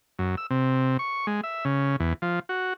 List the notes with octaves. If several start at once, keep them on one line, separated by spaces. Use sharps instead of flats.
F#2
E6
C3
C#6
G#3
E5
C#3
E2
F3
F#4